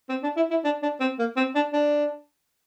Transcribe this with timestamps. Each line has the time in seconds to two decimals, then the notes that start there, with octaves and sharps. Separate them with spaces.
0.09 C4
0.23 D4
0.36 E4
0.50 E4
0.64 D4
0.82 D4
1.00 C4
1.19 A#3
1.37 C4
1.55 D4
1.73 D4